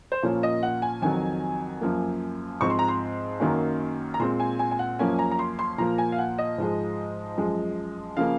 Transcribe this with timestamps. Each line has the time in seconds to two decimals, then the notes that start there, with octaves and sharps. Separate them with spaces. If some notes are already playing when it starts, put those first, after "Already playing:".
0.12 C5
0.23 A#2 F3 A#3 C#4 C#5
0.43 D#5
0.63 F#5
0.82 G#5
1.02 F2 D#3 F#3 G#5
1.81 F#2 F3 A#3
2.61 G#2 F3 C4 C#6
2.70 C6
2.79 A#5
2.88 C6
3.40 F#2 D#3 F#3 A#3 C#4
4.14 A#5
4.20 A#2 G#3 C4 C6
4.40 G#5
4.59 G#5
4.71 G#5
4.79 F#5
4.99 F#2 F3 A#3 C#4 G#5
5.19 A#5
5.31 A#5
5.39 C6
5.59 C6
5.78 A#2 F3 A#3 A#5
5.98 G#5
6.12 F5
6.18 F#5
6.38 D#5
6.58 G#2 F3 G#3
7.37 F#2 F3 G#3
8.17 C#3 F3 A#3 F5